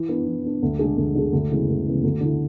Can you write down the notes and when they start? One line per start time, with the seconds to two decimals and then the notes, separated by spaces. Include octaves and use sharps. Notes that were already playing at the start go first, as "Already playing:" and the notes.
Already playing: E3
0.09 B3 D4
0.27 E3
0.44 B3 D4
0.62 D2
0.79 D3 G#3 D4 G#4
0.97 D2
1.15 D3 G#3 D4 G#4
1.33 D2
1.50 C#3 E3 G#3 B3
1.69 D2
1.86 C#3 E3 G#3 B3
2.03 D2
2.21 D3 A3 E4